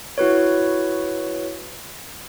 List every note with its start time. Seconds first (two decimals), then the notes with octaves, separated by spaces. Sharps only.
0.18 E4 F#4 B4 C#5